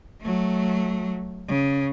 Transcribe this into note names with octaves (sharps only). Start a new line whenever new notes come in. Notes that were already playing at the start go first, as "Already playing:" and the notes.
F#3 A3
C#3